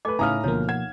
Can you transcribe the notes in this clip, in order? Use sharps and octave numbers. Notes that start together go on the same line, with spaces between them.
A3 B4 D#5 G#5 D6
A2 C#3 D#4 E4 F5 A#5 D#6 F6
D2 B2 F3 A#3 C#5
F#5 G#6 E7